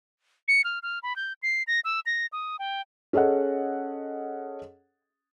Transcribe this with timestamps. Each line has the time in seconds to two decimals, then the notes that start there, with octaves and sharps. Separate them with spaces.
0.48 C#7
0.64 F6
0.83 F6
1.03 B5
1.16 G6
1.43 C7
1.67 A#6
1.84 E6
2.06 A#6
2.32 D#6
2.59 G5
3.13 C#4 G#4 A4 D#5 F#5